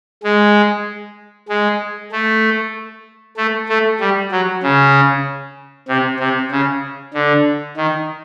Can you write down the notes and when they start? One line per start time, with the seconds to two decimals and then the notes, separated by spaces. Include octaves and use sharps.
0.23 G#3
1.49 G#3
2.12 A3
3.37 A3
3.69 A3
4.00 G3
4.31 F#3
4.63 C#3
5.88 C3
6.20 C3
6.51 C#3
7.14 D3
7.77 D#3